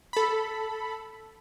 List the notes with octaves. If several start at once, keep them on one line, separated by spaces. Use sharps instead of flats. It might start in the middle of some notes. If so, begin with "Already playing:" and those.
A4 B5